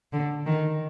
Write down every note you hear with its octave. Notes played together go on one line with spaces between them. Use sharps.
D3
D#3